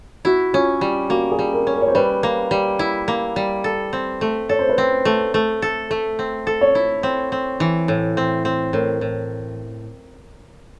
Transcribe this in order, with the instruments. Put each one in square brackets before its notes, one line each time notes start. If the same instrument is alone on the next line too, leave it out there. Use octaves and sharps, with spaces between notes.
[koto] E4 [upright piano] F#4
[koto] C#4 [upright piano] F4
[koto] G3
[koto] A#3 [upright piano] F#4
[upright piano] G#4
[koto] G3
[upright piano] A#4
[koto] C#4
[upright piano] A#4
C#5
C5
[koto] G3 [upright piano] B4
[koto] A#3
G3
E4
A#3
G3
A4
C4
A3
[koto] A4 [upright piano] C#5
[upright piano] C5
B4
[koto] C4 [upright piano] C5
[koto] A3
A3
A4
A3
C4
A4
[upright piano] C#5
[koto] E4
C4
C4
E3
A2
C4
C4
[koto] A2 [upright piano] A#4
[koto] A2